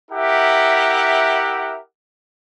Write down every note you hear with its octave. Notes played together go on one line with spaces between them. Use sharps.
E4 G4 A#4 E5 F#5